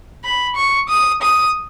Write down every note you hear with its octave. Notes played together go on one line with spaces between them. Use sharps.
B5
C#6
D#6
D#6